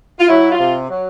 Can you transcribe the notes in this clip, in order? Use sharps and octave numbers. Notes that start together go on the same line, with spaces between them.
F4
F#3 E4
F4
C3
F#3